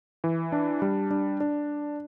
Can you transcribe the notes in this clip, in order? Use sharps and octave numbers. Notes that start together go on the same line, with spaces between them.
E3
D4
G3
D4
D4